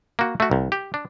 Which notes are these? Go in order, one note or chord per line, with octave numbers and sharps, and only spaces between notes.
A#3 F#4
A3 F#4
C2
G4
D4